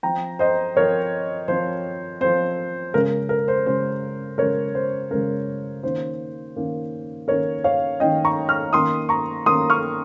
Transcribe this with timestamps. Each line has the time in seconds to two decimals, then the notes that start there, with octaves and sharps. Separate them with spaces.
0.03 F3 C4 G5 A#5
0.39 C5 D#5
0.76 F3 C4 A#4 C#5
1.48 F3 C4 C5
2.21 F3 C4 C5
2.94 C#3 G#3 C#4 A#4
3.29 A#4
3.48 C5
3.66 C#3 G#3 C#4 C5
4.38 C#3 G#3 C#4 A#4 C#5
4.75 C5
5.10 C#3 G#3 C#4 A#4
5.83 D#3 A#3 C#4 C5
6.56 D#3 A#3 C#4
7.28 D#3 A#3 C#4 A#4 C#5
7.64 C#5 F5
8.00 D#3 A#3 C#4 D#5 G5
8.25 A#5 C#6
8.49 C#6 F6
8.73 D#3 A#3 C#4 C6 D#6
9.09 A#5 C#6
9.46 D#3 A#3 C#4 C6 D#6
9.70 C#6 F6